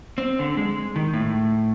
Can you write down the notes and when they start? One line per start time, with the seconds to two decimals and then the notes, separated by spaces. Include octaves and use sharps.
0.18 C4
0.39 D3
0.57 G#3
0.96 D#3
1.13 A2